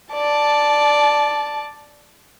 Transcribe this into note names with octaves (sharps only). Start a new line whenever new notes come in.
D5 A5